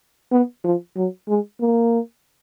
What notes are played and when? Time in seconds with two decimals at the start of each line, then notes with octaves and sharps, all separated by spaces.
0.32 B3
0.64 F3
0.96 F#3
1.28 G#3
1.61 A#3